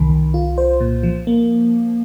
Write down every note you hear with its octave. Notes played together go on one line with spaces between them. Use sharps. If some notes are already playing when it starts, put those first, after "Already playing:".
Already playing: C2 D#3
C2
F4
C5
A#2
F3
A#3